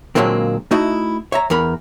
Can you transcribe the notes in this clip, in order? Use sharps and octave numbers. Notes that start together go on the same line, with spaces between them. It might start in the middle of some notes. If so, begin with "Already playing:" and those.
A#2 D3 F#3 G#3 A#3 C4
A3 D#4 E4 F#4 D#5
C#5 E5 A#5
E2 E3 A#4 B5